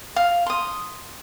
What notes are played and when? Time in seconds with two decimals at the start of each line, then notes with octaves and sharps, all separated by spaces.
0.16 F5
0.46 C6 D#6